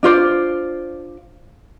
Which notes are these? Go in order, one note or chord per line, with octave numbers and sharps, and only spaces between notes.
D4 F4 C5 D5